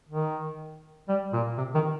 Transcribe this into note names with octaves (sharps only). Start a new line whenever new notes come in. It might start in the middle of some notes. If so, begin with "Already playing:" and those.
D#3
G3
A#2
C3
D#3